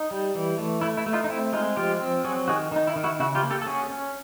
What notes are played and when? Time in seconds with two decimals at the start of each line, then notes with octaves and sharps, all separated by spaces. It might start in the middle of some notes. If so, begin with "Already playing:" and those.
Already playing: D#4
0.11 G3
0.35 E3
0.58 A3
0.81 A3 E4
0.97 E4
1.06 A3
1.13 D#4 F4
1.24 D#4
1.29 C4 E4
1.53 G#3 D#4 F4
1.77 F3 F4 G4
2.00 C4
2.24 F#3 F#4 G#4
2.48 D#3 F#4 G#4
2.71 D#3 D#4
2.87 E4
2.96 D#3
3.04 E4 F#4
3.20 C#3 E4 F#4
3.35 F4 G4
3.43 A#3
3.51 G4 A4
3.62 A4
3.66 C#4 F#4 G#4
3.90 C#4